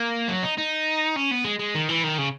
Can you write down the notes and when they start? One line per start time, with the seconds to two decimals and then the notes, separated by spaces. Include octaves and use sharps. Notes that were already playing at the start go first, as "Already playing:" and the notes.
Already playing: A#3
0.28 F#3
0.43 D#4
0.58 D#4
1.16 C#4
1.31 B3
1.44 G#3
1.59 G#3
1.75 D#3
1.89 E3
2.04 D#3
2.18 C#3